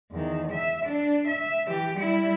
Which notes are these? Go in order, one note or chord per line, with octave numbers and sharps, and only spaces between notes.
E2 D#3
E5
D4
E5
E3 G4
G3 E4